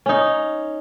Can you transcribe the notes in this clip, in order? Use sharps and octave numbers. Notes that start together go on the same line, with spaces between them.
C#4 D#4